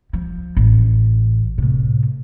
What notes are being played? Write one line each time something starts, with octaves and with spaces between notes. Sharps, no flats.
F3
A1
A2 C3